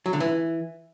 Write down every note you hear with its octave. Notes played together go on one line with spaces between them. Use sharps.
F#3
D3
E3